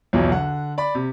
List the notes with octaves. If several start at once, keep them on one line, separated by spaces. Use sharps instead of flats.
B1 E2 F3 F#3
D3 F#5
D5 B5
C3